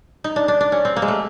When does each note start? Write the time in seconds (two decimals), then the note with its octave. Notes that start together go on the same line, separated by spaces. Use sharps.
0.24 D#4
0.36 D4
0.48 D4
0.61 D4
0.72 C#4
0.85 C4
0.96 A#3
1.02 G#3
1.08 A3